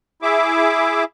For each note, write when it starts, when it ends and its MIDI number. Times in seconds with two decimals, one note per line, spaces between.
0.22 1.04 64
0.22 1.04 68
0.22 1.04 76
0.22 1.04 86